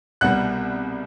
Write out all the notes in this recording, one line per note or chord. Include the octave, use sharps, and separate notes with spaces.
C2 B2 G3 F#5 F#6